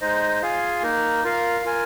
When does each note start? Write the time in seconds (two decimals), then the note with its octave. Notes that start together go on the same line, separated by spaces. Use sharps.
0.01 G#3 D#4 C5 D#5
0.42 F4 G#4 F5 G#5
0.82 A#3 D#4 A#4
1.24 F4 A#4 F5
1.65 F4 A#4 G#5